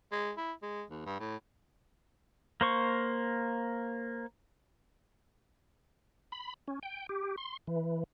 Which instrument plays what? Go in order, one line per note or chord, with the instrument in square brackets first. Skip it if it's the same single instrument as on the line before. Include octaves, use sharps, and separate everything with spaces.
[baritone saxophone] G#3
E4
G#3
D#2
G2
A2
[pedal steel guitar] A#3 C5 C#6
[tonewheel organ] B5
C#4
G5
G4
C6
E3